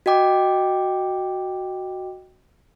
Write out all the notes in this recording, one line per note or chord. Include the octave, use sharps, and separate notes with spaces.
F#4 D#5 G5 D6